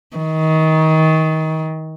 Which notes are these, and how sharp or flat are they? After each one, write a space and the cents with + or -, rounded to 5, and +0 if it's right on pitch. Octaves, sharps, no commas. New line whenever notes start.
D#3 +25